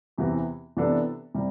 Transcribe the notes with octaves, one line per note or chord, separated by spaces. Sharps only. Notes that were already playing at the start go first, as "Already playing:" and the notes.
E2 C3 E3 B3
C3 E3 B3 D4 A4
C3 G3